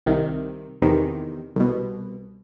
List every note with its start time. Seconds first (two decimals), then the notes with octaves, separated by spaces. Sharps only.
0.06 C2 C3 D#3
0.82 E2 C3 D#3
1.56 C2 B2